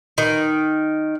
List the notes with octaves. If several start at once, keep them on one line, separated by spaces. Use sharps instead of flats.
D#3